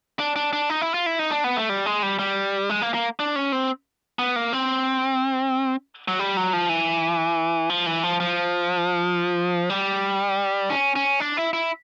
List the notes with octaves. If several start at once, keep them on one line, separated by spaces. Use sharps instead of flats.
D4
D4
D4
D#4
E4
F4
E4
D#4
D4
B3
A3
G3
G#3
G3
G3
G#3
A#3
A#3
D4
C#4
C4
B3
A#3
C4
F#3
G3
F#3
F3
E3
F3
E3
F3
F3
G3
C#4
C#4
D4
E4
E4